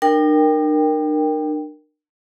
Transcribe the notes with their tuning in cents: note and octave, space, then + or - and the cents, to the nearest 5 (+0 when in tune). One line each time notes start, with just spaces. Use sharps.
D4 +45 A#4 +0 G5 +10